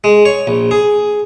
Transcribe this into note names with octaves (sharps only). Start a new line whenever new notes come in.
G#3
C#5
A#1
G#4